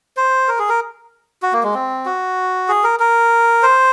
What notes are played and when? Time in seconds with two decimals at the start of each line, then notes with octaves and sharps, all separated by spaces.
0.17 C5
0.48 A#4
0.59 G#4
0.69 A#4
1.42 F#4
1.53 A#3
1.63 G#3
1.74 C4
2.06 F#4
2.69 G#4
2.84 A#4
3.00 A#4
3.63 C5